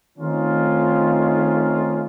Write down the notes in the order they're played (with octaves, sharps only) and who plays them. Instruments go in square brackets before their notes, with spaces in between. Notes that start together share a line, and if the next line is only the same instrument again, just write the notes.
[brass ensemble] D#3 A3 C4 C#4 D#4 F4